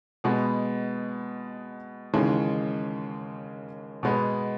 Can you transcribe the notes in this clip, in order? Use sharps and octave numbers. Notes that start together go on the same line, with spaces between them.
B2 G#3 B3
D#2 C#3 E3 G#3
B2 G#3 B3